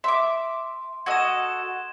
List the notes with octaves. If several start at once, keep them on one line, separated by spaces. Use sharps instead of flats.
E5 C6 D6
F#4 A4 D#5 G#6 E7